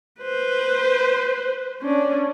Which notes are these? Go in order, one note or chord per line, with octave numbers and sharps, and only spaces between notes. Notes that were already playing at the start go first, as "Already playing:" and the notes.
B4 C5
C#4 D4